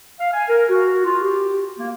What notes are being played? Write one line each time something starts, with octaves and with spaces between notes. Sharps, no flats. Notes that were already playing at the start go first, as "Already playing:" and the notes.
F5
G#5
A#4
F#4
F4
G4
A#3